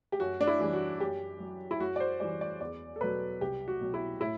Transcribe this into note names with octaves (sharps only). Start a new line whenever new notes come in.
G4
F#2 F#4
D4
E4
E3 G3
F#4
F#2 G4
F#3
E4
F#2 F#4
D5
C5
E3 G3 D5
D5
E2 D5
A4
B2 F#3 B4
C2 G4
F#4
B2 F#3
E4
A2 E4